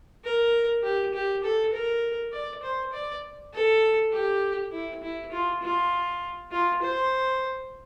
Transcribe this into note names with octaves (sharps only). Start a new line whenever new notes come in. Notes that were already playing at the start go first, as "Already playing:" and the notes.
A#4
G4
G4
A4
A#4
D5
C5
D5
A4
G4
E4
E4
F4
F4
F4
C5